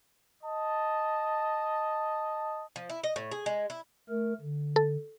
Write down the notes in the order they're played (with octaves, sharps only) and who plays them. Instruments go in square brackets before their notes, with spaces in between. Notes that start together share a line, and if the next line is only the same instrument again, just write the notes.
[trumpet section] D#5 A5
[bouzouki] F3
E4
D#5
A2
G#4
G#3
E4
[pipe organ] A3 A#4
D3
[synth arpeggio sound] A4